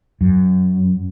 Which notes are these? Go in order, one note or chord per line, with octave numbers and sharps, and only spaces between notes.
F#2